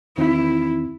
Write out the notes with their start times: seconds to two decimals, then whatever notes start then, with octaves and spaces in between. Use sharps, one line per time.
0.18 E2 D#3 C4 E4